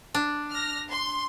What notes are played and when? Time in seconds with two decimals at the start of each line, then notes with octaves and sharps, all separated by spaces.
0.14 D4
0.51 F6 A#6
0.89 C6